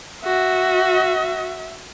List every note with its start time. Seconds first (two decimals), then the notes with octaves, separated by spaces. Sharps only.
0.25 F#4 E5